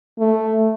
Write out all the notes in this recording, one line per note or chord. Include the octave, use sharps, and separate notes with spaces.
A3